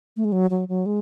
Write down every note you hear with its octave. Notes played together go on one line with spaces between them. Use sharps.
A3
G#3
F#3
F#3
F#3
G#3